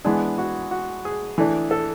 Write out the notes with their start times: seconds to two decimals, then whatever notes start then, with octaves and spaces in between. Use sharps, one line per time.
0.04 E3 G#3 B3 D4 G#4
0.38 F#4
0.71 F#4
1.05 G#4
1.38 E3 A3 D4
1.71 A4